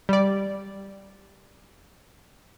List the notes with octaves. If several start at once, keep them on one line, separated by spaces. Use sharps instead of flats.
G3 D5